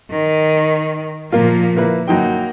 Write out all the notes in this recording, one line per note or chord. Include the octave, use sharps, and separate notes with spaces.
D#3
A#2 F3 A#3 F4
A#3 E4 B4
F#2 A#3 D#4 G5